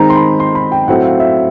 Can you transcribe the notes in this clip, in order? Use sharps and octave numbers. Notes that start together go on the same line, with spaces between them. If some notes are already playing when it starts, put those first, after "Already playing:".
Already playing: D#3 G#3 C4 D#4 A#5
C6
B5
C6
B5
G5
A2 F#3 A3 C4 E4 F#5
F5
E5